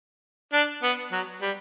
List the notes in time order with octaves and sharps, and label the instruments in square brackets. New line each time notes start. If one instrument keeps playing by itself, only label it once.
[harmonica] D4
B3
F#3
G3